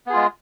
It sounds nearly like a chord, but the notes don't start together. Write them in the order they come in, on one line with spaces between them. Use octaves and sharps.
B3 G#4 F4 G#3